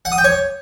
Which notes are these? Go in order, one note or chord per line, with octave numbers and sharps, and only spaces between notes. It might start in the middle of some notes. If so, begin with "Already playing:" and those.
F#5
D#6
G5
C#5